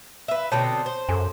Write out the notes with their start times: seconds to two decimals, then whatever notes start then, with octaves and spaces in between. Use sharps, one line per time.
0.28 B4 E5
0.52 B2 D3 C4 C#5 A5
0.86 C5
1.09 F#2 A4 G#5